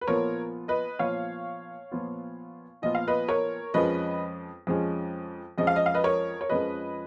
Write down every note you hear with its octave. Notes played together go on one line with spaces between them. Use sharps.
B4
A#2 F3 B3 F4 A#4 C#5
B4 D#5
A#2 F3 B3 F4 C#5 F5
A#2 F3 B3 F4
A#2 F3 B3 F4 D#5
F5
B4 D#5
A#4 C#5
F2 F3 G#3 C#4 B4 D#5
F2 F3 G#3 C#4
F2 F3 G#3 C#4 D#5
F5
D#5
F5
B4 D#5
A#4 C#5
C#5
F2 F3 G#3 C#4 B4 D#5